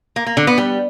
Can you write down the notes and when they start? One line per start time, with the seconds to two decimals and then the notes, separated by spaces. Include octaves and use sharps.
0.16 A#3
0.26 A#3
0.37 D3
0.47 B3
0.58 G3